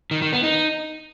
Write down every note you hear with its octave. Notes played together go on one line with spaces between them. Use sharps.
D#3
D#3
B3
D#4